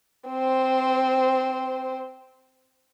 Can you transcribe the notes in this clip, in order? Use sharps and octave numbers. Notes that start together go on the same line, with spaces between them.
C4 C5